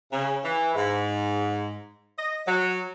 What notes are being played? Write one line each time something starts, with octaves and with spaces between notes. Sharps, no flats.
C#3
E3
G#2
D#5
F#3